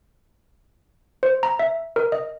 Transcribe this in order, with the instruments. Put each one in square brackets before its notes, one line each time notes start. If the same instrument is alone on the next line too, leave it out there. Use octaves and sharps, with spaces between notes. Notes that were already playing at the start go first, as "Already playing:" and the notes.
[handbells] C5
A#5
E5
A#4
D#5